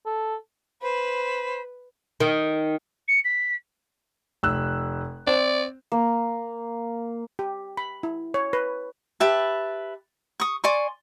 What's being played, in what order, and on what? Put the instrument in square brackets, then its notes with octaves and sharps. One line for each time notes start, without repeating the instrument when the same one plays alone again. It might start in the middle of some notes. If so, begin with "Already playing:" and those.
[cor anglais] A4
[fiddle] B4 [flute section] C5 B5
[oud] D#3
[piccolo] C#7
B6
[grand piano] F1 E6 F#6
[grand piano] C4 [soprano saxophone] D5
[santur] A#3
[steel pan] G4
B5
E4
C#5
B4
[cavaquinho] G4 B4 E5 A5
C#6 D#6
D5 G#5 C6 C#6